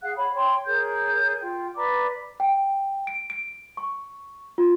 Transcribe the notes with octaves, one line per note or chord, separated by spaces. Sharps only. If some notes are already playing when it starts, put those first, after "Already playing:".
G#4 F5 F#5 F#6
C#5 B5
C#5 G5 C6 C#6
G#4 A#4 C#5 G6
F4 G5
B4 D5 A#5 D6
G5
D7
D7
C#6
F4